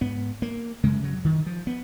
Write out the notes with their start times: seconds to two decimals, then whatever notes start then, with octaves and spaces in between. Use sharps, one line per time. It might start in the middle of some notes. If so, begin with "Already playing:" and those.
0.01 G#2 B3
0.42 A#3
0.84 F#2 C#3 G#3
1.04 F#3
1.25 D#3
1.46 F3
1.67 B3